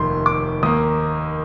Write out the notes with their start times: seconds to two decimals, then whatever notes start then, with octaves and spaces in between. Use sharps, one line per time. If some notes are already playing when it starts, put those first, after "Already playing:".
Already playing: F1 D#2 D#3 C6
0.26 D6
0.63 D#2 D#3 A#3 D#6